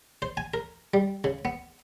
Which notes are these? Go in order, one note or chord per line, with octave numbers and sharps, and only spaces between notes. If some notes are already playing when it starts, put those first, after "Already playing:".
C5
G#5
A#4
G3
C#3
B3